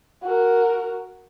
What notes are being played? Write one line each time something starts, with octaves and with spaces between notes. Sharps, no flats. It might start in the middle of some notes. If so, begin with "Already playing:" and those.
F#4 A#4